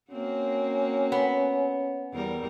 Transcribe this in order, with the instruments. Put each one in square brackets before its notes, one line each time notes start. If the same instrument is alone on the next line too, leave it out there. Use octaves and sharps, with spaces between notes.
[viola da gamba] A#3 C4 F#4 [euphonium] C#4
[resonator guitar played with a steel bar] B3
[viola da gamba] E2 G3 A#4